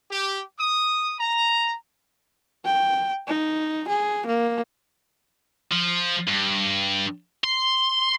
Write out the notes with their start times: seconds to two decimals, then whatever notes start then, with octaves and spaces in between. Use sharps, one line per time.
0.11 G4
0.59 D#6
1.20 A#5
2.65 G5
3.27 D#4
3.88 G#4
4.27 A#3
5.71 F3
6.28 G2
7.44 C6